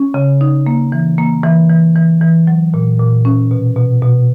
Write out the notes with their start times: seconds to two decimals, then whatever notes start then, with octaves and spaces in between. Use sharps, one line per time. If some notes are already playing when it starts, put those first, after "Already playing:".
Already playing: C#4
0.14 C#3
0.41 D#4
0.67 A#3
0.92 E3
1.18 A#3
1.44 E3
1.70 E3
1.95 E3
2.21 E3
2.47 F#3
2.74 A#2
2.99 A#2
3.25 C#4
3.51 B2
3.76 B2
4.02 B2